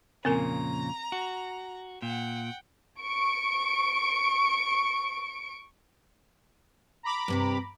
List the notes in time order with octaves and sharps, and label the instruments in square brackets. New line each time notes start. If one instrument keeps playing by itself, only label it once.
[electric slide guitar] F2 A#2 C#3 [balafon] C4 A#4 G#5 [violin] A#5
[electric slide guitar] F#4
[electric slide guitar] A#2 [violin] F#5 G5
[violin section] C#6 D7
[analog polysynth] A#5 B5 D6
[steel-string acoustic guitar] G2 C3 G4